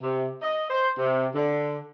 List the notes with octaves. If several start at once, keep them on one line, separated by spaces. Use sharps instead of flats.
C3
D#5
C5
C3
D3